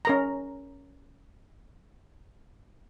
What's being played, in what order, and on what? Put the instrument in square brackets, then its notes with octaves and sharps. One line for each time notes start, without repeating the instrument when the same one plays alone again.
[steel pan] C#4 A#4 A#5